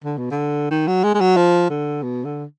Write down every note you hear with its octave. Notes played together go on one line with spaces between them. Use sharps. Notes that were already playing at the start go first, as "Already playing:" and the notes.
D3
B2
D3
D#3
F#3
G#3
G#3
F#3
F3
D3
B2
D3